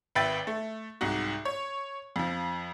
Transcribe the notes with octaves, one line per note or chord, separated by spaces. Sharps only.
G#1 B4 E5 G5 A6
A3
C2 G#2 F#4
C#5
F2 F3